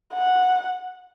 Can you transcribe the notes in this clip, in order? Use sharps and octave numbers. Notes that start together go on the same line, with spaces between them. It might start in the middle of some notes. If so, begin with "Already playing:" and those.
F#5